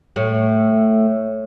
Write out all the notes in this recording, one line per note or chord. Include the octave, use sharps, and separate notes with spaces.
A2 A3